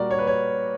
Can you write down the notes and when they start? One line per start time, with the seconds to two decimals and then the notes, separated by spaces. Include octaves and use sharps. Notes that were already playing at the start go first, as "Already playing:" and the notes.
Already playing: A#2 G3 F#4 A#4 D5
0.11 C#5
0.19 B4
0.27 C#5